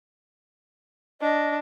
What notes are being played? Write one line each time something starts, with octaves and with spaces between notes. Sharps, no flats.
D4 D#5